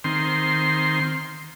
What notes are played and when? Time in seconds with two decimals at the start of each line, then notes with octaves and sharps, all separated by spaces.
0.04 D#3 C4 C6